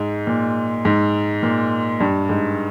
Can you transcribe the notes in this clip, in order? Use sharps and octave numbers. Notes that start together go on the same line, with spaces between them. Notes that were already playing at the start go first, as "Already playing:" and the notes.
Already playing: G#2
A#2
G#2
A#2
G2
G#2